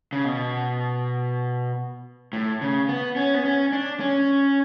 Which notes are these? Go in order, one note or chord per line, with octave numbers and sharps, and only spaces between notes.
C#3
B2
A2
C#3
B3
C#4
B3
C#4
D4
C#4